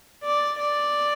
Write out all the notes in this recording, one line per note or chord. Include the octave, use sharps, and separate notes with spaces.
D5
D5